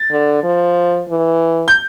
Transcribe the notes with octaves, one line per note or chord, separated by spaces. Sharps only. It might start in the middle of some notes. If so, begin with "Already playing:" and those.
Already playing: A6
D3
F3
E3
G6